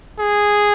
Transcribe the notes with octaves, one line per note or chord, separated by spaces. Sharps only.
G#4